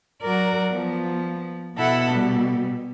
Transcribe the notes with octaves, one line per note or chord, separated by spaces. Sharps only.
F#3 F#4 A#4 D5
F3 B3
B2 E4 A4 F#5
G3